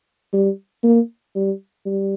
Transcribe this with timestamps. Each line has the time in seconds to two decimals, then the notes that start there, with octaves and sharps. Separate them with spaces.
0.33 G3
0.83 A#3
1.35 G3
1.85 G3